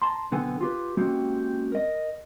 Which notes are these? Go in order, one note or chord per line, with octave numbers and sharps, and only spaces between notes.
A5 A#5 C6
B1 D3 B3 C4 A4 G#5
F4 G4 B4
G#3 A#3 C4 C#4 F#4 G4
A#4 D#5